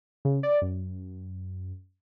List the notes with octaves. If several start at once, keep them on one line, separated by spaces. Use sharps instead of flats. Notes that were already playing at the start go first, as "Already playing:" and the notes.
C#3
D5
F#2